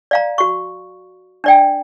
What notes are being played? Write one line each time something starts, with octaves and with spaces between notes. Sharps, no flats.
D5 F5 A#5
F#4 C#6
D4 D5 G5